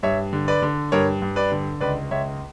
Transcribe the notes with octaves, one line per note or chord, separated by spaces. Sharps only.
G2 C#5 E5
D3
B4 D5
D3
G2 A#4 C#5
G2
B4 D5
D3
C#2 B4 D5
C#2 C#5 E5